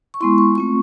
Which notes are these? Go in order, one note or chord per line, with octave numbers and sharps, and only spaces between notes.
C#6
G#3 B3 E4 C6
C#6
A3 C4 F4 C#6